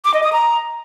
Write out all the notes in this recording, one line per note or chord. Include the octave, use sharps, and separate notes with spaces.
D6
D#5
D#6
A#5